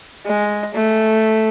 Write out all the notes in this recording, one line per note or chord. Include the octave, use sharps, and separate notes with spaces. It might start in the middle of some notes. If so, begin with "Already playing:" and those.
G#3
A3